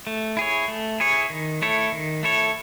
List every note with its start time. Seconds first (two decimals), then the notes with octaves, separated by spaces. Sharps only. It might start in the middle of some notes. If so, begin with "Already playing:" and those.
0.07 A3
0.37 E4 G#4 C#5
0.68 A3
1.00 E4 G#4 C#5
1.30 D#3
1.62 A3 E4 A4 C#5
1.92 D#3
2.23 A3 E4 A4 C#5